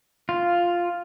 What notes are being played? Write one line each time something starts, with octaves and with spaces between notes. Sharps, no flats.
F4